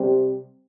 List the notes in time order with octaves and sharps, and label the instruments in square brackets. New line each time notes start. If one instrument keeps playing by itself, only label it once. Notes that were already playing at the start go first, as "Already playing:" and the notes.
Already playing: [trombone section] C3 G3 C4